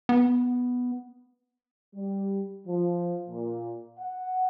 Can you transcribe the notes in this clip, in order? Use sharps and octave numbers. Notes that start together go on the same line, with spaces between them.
B3
G3
F3
A#2
F#5